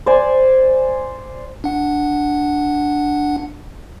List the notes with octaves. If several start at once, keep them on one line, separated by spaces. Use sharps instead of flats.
C5 D5 G#5
D4 F#5